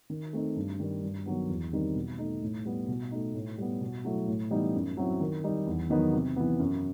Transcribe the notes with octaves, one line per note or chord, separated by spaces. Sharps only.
D#3
A3 C4 D#4
G2
D#3 G3
G2
D#3 F#3 B3
E2
D#3 G3 C4 D#4
B2
A3 D#4
A2
G3 B3
B2
A3 D#4
A2
G3 B3
B2
F#3 A3 E4
A2
E3 G3 B3 D#4
F#2
F#3 C4 E4
D#3
G3 D#4
E2
D#3 F#3 B3 D#4
C3
E3 B3
F#2